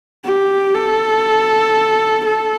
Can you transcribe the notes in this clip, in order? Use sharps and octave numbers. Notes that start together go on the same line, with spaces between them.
G4
A4
A4